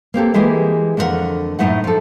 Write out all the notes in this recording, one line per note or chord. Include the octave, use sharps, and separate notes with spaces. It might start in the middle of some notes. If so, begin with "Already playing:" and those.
A#3 C4 G4 A4
E3 G#3 A#3 E4 G4 G#4
F2 D3 A3 D4 A#4 F#5
F#2 A2 A3 D#4 E4 F#5
F3 A4